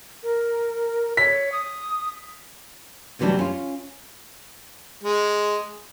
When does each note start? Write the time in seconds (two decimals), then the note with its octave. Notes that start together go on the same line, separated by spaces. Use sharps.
0.23 A#4
1.17 C#5 B6
1.52 D#6
3.19 D2 C3 E3 F#3 G3 D4
3.39 C#4 F4
5.04 G#3